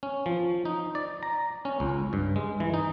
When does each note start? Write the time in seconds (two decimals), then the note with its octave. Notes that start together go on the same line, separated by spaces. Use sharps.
0.03 C#4
0.26 F3
0.65 D#4
0.95 D5
1.23 A#5
1.65 C#4
1.80 C#2
2.13 G2
2.36 G#3
2.60 E3
2.74 D#4